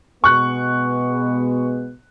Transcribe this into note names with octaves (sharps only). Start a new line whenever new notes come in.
B2 G#3 B3 C#6 F#6